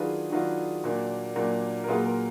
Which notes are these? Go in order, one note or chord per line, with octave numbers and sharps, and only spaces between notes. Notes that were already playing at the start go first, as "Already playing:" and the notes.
Already playing: D#3 F#3 D4 F4 G#4 B4
D#3 F#3 D4 F4
A#2 F#3 A#3 D4
A#2 F#3 A#3 D4
A#4
A#2 F#3 A#3 F4 G#4 B4
A#4